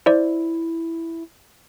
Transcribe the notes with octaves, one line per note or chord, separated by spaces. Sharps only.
E4 C5 D5